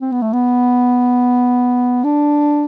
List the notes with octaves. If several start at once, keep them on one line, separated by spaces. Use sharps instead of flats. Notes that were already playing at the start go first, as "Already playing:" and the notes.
C4
B3
A3
B3
D4